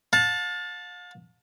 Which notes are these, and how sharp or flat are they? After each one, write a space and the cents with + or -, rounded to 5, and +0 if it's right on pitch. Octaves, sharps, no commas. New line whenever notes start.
F5 +40 A5 +0